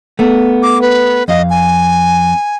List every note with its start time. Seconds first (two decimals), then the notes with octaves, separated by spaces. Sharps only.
0.19 A3 B3
0.63 D6
0.82 B4
1.28 F2 D#5 F5
1.50 G#5